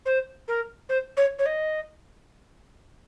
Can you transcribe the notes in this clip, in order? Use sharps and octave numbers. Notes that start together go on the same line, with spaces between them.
C5
A#4
C5
C#5
C#5
D#5